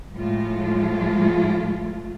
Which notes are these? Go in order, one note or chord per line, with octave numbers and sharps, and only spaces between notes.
A2 F3 F#3 G#3 A3 F4